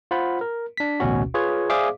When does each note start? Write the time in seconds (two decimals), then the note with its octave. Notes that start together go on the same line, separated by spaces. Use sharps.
0.11 F4 C5 F#5 B5
0.41 A#4
0.77 D4 B6
1.00 A1 D2 B2 C#4 F#4
1.34 F4 G#4 B4 C#5
1.70 G#4 C5 D5 E5 F5 D6